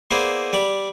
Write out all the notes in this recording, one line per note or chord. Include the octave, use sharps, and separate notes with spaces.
A#3 B3 E4 G#4 C5 D5
G3 D5 B5 D6